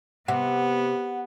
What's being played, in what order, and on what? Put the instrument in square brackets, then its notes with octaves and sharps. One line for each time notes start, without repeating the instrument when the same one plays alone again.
[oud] C3 [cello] B3 [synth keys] F#5